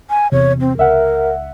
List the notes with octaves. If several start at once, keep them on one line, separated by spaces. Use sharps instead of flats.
G#5
E2 C3 C#5
C4
C#2 A#4 E5 F#5